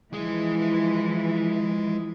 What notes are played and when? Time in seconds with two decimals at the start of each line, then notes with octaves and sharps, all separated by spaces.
0.13 E3 F3 G#3 G#4